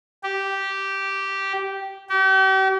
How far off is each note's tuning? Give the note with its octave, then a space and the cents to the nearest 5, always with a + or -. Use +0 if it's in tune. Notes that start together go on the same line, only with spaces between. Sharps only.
G4 -10
G4 -40